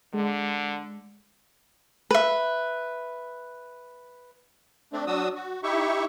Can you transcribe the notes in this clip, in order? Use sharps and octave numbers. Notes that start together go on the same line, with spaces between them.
D3 G#3
B4 E5
A3 C4 D4
F#3 D4 F#4 D#6 E6
F#4
D#4 E4 G4 E5 C#6